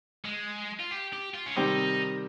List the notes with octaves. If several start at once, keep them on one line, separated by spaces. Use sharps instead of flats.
G#3
F4
G4
G4
F4
C#4
C3 D#3 G3 C4 D#4 G4